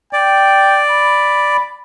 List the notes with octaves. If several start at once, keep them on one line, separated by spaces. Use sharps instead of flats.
D5 G5
B5